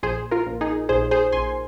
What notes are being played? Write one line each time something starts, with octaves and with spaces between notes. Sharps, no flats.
A#1 G#4 C5
F4 A#4
A#1
D#4 G#4
A#1 G#4 C5
G#4 C5
A#1 G#5 C6